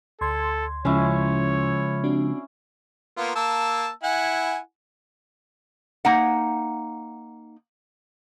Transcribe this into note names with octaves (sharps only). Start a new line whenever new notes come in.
D2 A4 C6 G#6
C#3 F3 G#3 C#4 E4 C#5
C4 D4 F#4
A#3 B3 F4
A#3 A5 E6
E4 F#5 G#5
A#3 D#4 F#5